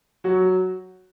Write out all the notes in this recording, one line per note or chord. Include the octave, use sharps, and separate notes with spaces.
F#3 F#4